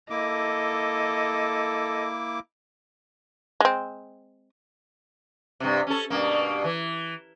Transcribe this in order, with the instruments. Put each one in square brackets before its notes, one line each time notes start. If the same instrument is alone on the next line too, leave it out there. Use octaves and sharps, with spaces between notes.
[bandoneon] A#3 E4 D6 [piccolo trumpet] A4 [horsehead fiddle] D#5
[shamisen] G#3 C4
[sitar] G2 C3
C#4 A4
G2 B2 A#3
E3